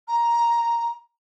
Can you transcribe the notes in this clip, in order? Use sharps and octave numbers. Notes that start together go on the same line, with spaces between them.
A#5